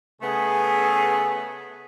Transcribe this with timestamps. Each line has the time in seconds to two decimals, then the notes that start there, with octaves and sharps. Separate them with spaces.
0.22 C#3 A3 B3 G#4